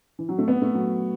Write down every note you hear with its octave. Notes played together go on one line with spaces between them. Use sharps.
E3
F#3
A3
B3
A3
F#3